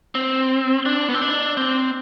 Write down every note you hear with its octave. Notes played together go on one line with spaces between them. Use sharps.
C4
D4
B3
C4
D4
C4